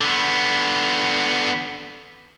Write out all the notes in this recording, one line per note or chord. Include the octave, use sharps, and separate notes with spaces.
D3 B3